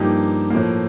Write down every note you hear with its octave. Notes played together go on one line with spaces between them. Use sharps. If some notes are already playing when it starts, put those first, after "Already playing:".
Already playing: G2 F3 A#3 D#4 G4
A2 F3 A#3